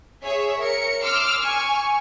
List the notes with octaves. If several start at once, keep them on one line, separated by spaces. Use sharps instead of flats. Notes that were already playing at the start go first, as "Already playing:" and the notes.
G#4 C#5 E5
A#4 C#7
C6 D6 E6 F6
G#5 C#6